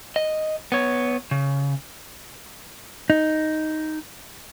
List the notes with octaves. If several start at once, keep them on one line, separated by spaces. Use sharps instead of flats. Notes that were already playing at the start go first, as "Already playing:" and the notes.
D#5
B3 C#5
C#3
D#4